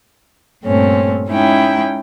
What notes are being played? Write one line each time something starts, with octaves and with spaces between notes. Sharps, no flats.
G2 A#2 A3 C4 C#4
G#3 C#4 D#4 E4 G5